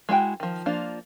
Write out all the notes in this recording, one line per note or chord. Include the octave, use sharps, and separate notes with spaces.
G#3 E4 F#4 G5
D#3 F3
F3 A#3 D4 F4